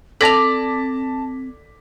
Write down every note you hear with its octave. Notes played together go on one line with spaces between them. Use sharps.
C4 A4 D5 A5 A#6 B6 F7